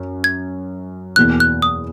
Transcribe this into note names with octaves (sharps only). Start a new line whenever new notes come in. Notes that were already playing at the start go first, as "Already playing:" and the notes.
Already playing: F#2
G#6
E2 B2 A#3 F#6
F#6
D#6